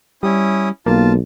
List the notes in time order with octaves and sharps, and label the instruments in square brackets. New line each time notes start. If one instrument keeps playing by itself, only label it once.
[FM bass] G3 [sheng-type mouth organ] C#4 E4 D#6
[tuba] B1 [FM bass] A#3 [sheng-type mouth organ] F4 A5